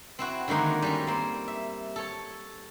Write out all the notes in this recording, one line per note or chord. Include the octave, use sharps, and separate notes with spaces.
C4 E4 F#4
D3 D#3 G#3 A#3 D#4
G3 G#3 C#4
A#3 C4
E5
A4 C#5